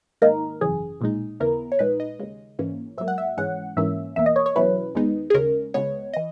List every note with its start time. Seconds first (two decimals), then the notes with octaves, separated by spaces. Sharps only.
0.22 G#2 D#3 A#3 D#4 A#4
0.61 G#1 F#2 C#3 E3 G#4
1.00 B1 A#2 G#3 D#4
1.40 D#2 C#3 E3 B3 E4 A#4
1.72 C#5
1.79 A#1 A#2 G#3 D#4 B4
2.00 D#5
2.20 D#2 C#3 G#3
2.59 A#1 G#2 E3 A#3 C#4
2.98 G#2 F#3 A#3 E5
3.08 F#5
3.18 E5
3.37 G#1 G#2 E3 G#3 C#4 F#5
3.77 G#2 E3 A#3 C#4 E5
4.16 E2 B2 A#3 E5
4.26 D#5
4.36 C#5
4.46 C#5
4.56 E2 B2 F#3 C#4 E4 B4
4.95 D#2 D#3 G#3 B3 D#4
5.30 G#4
5.34 D#2 C#3 G#3 C#4 A#4
5.74 C#2 C#3 G#3 B3 C#5
6.14 E3 D#5